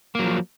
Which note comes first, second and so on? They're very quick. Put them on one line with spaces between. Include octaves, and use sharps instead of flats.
A#3 F#3 F3